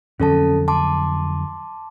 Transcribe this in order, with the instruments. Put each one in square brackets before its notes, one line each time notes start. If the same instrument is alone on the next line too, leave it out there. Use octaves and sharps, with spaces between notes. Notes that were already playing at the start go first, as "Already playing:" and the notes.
[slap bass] F2 D3 F#3 [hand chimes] C#4 A4 A5
[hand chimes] A5 C6 D6